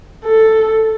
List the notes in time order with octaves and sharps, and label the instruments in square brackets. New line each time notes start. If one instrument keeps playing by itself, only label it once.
[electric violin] A4